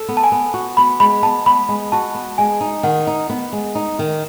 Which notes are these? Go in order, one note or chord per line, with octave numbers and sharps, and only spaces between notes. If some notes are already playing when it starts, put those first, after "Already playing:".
Already playing: A4
B3
A5
G#5
B3
F#4
B3 B5
G#3 B5
B3 A5
B3 B5
G#3
F#4 A5
B3
G#3 G#5
D#4
D#3 F#5
D#4
B3
G#3
D#4
D#3